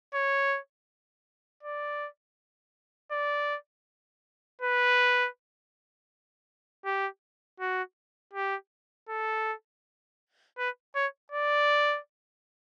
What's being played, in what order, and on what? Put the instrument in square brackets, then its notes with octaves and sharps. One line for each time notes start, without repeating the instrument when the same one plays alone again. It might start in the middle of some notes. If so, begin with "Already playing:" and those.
[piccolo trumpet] C#5
D5
D5
B4
G4
F#4
G4
A4
B4
C#5
D5